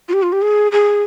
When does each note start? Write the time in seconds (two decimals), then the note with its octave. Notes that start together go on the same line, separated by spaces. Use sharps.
0.08 F4
0.13 G4
0.23 F4
0.32 G4
0.42 G#4
0.72 G#4